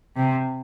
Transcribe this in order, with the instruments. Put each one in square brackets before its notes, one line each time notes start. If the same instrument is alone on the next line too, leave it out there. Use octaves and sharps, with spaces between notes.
[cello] C3